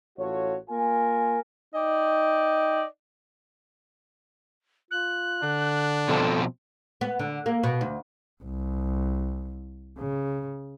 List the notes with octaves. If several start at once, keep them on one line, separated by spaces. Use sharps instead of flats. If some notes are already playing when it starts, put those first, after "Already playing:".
A1 F4 F#4 A4 C#5
A#3 F4 A#4 G#5
D#4 D5 D#5 G5
F4 F#6
D3 D4
B2 F3 C4 A4
B3
D3
A#3
B2
D2
C2
C#3